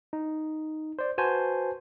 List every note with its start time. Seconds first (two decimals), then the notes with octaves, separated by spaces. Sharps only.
0.13 D#4
0.99 C5 D5
1.18 F#4 B4 C5 G#5 A5